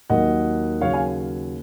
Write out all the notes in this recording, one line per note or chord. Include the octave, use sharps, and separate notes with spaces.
D#2 D#3 F#3 A#3 D#5 F#5
D#2 C#3 F#3 C#5 F5
F5 G#5